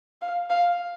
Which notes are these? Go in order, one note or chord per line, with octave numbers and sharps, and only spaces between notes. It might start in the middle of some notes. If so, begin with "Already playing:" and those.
F5
F5